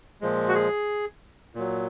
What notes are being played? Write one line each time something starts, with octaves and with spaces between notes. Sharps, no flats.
A#2 F3 G#3
F#4
G#4
A#2 F#3